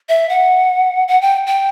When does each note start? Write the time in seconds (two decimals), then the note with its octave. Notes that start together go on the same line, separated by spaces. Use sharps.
0.09 E5
0.29 F#5
1.08 F#5
1.21 G5
1.47 G5